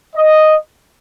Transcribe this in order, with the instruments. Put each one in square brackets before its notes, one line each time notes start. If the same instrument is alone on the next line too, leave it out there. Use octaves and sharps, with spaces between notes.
[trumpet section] D#5